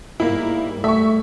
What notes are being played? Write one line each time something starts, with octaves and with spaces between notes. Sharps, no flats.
G#2 G3 A#3 E4
A3 E5 C#6